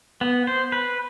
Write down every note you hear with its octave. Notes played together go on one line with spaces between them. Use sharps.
B3
C5
B4